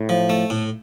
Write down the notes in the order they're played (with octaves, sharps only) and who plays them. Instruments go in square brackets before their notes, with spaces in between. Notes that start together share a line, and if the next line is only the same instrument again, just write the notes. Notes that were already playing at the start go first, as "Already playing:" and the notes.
Already playing: [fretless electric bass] A2
[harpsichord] F3
A3
A2